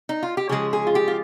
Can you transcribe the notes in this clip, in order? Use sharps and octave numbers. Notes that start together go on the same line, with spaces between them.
D#4
F4
G4
C#3 F3 G#3 G#4
G#4
F4
G4
F4